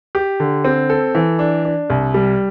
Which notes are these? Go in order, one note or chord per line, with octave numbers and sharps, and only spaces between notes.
G4
D3
C4
A4
E3
D4
D4
C2
G3